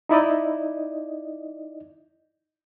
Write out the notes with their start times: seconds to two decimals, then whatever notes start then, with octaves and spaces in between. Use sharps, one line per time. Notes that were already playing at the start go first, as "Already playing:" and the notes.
0.09 D#4 E4 D5 D#5